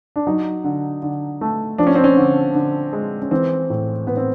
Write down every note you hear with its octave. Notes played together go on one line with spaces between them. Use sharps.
D4
F#3 D#4
D3
D3
A3
F3 D4
C#4
C4
C#4
D3
D3
G#3
C#4
E3 C4
A2
A2 B3
C4